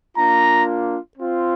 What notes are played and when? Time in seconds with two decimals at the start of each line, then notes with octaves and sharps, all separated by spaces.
0.16 A#3 D4 F4 A#5
1.18 C4 F4